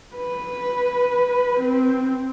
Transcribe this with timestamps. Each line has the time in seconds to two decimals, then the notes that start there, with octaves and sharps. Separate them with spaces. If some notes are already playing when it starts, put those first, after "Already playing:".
0.16 B4
1.60 C4